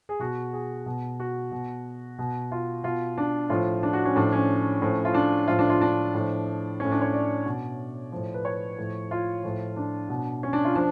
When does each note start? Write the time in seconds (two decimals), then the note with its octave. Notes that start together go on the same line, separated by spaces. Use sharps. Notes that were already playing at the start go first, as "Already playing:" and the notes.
0.09 G#4
0.19 B2 F#4
0.53 G#4
0.86 B2
1.20 F#4
1.51 B2
2.19 B2
2.52 F4
2.83 B2 F4
3.18 D4
3.50 A2 F3 F4
3.83 D4
3.93 F#4
4.05 C#4
4.16 A2 F3 D4
4.32 C#4
4.82 A2 F3
5.05 F4
5.14 D4
5.48 A2 F3 F4
5.59 D4
5.69 F4
5.81 D4
6.14 A2 F3
6.80 A2 F3 C#4
6.91 D4
7.01 C#5
7.13 D5
7.45 B2
8.12 A2 F3
8.34 B4
8.45 C#5
8.78 A2 F3
9.11 F4
9.43 A2 F3
9.76 D4
10.09 B2
10.43 C#4
10.53 D4
10.65 F4
10.76 F3 D4